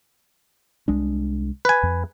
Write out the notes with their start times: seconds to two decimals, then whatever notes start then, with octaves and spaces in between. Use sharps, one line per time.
0.88 C2 G#3 D4
1.65 B4 G#5
1.83 F2